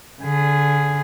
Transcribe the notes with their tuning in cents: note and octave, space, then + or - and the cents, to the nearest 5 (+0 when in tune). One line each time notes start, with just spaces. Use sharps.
D3 -25 G#4 +0